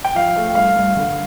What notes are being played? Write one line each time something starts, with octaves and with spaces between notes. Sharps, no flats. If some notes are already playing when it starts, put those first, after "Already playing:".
G5
F3 F5
A3
G2 F5
G2
D3